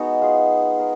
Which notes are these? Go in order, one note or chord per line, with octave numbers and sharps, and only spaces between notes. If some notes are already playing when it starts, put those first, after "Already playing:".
Already playing: G#3 B3 D#4 F#4
F4 G#4
A#4